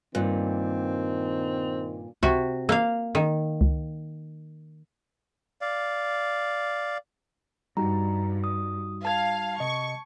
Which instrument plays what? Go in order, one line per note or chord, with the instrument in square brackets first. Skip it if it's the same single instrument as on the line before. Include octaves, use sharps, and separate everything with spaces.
[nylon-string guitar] G2 [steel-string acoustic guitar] A#2 [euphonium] D#3 [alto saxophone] C4
[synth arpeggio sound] C#2 [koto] C3 F#4
[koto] A#3 F5 [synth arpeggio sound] E6
[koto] D#3
[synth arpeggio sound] C#2
[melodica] D5 F5
[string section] G2 [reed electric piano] G3 D#4 F#4 [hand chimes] A#5
[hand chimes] D#6
[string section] F5 [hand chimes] A5 G#6
[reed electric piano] C3 D#5 [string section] C#6